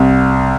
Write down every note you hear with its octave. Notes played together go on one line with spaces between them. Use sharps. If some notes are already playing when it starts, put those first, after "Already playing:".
Already playing: C2